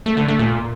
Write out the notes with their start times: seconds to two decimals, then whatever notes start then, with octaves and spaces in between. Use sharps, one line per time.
0.06 A3
0.17 D3
0.28 A3
0.39 A#2